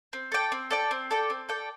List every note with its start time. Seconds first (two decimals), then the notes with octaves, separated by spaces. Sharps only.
0.13 C4
0.32 A4 D5 G5
0.52 C4
0.71 A4 D5 G5
0.91 C4
1.11 A4 D5 G5
1.30 C4
1.49 A4 D5 G5